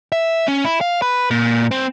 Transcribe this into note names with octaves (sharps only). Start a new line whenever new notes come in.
E5
C#4
E4
F5
B4
A#2
C4